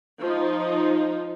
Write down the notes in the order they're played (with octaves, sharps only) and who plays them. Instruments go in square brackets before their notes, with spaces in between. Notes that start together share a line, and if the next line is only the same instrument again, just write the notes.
[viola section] F3 D#4